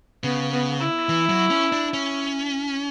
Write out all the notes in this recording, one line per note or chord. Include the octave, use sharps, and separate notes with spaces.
C#3 B3
B3
E4
E3
F#3
C#4
D4
C#4